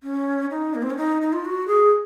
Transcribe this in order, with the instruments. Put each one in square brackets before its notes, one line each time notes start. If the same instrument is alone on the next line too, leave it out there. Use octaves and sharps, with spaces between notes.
[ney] C#4
D#4
A#3
C4
C#4
D#4
D#4
F4
F#4
G#4